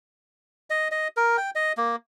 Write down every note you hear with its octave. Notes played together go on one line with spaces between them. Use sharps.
D#5
D#5
A#4
G5
D#5
A#3